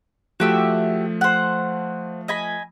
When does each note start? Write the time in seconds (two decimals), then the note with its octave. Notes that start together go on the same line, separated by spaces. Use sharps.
0.40 F3 A3 F#4 G4 E5
1.21 C5 F#5
2.28 D#5 G#5 B5